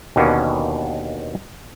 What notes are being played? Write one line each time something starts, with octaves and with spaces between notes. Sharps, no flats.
D#2 B2 D3 A#3 B3 C#4